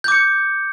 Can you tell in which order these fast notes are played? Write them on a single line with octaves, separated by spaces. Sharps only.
G6 D6 C#7